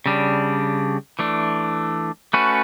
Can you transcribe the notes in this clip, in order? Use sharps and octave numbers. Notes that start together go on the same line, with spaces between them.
C#3 G3 D4
E3 A3 D4
A3 C#4 F#4 B4